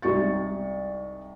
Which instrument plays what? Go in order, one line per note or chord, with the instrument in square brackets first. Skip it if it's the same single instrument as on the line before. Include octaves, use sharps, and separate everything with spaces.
[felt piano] C2 G#3 D#4 C#6 A6